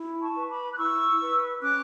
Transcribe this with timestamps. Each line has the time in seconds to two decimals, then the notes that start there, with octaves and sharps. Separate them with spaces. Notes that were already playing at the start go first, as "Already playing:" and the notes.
Already playing: E4
0.22 A5 C#6
0.36 B4
0.50 B5 D6
0.73 F#6
0.78 E4 C#6 E6
1.21 B4
1.62 C#4 D6 F#6